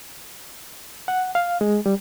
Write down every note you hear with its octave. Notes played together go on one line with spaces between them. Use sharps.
F#5
F5
G#3
G3